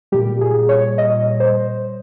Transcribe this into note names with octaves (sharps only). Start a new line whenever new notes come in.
A#2 G3 G4
G#4
C#5
D#5
C5